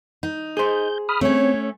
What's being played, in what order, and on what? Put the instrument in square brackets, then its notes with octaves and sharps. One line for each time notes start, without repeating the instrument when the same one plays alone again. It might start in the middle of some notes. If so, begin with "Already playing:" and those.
[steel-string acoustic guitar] D#4
[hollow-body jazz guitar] G#4 C5 [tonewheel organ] G6
[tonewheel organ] B5 D#6 F6
[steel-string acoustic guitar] A3 C#4 [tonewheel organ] C4 [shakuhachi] C#5